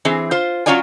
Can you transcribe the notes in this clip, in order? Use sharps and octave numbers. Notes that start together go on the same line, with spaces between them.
E3 C4 G#4
F4 C5
F#3 C#4 F4 C#5 D5 G#5